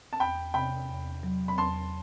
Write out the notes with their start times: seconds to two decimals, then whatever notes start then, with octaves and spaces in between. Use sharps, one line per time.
0.13 A5
0.19 E2 G5 B5
0.54 C3 G5 B5
0.89 E2
1.23 F#3
1.48 B5
1.58 E2 A5 C6